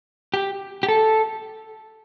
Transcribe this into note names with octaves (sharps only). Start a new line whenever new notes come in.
G4
G4
A4